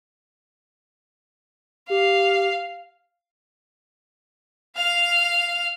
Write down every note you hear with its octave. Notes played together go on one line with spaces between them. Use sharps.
G4 F5
F5 F6